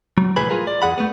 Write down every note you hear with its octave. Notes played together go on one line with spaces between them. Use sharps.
F#3
C2 A2 E3 G#4 B4 B5
F4 G#4 A#4
D5
E2 G#4 F#5 B5
A3 B3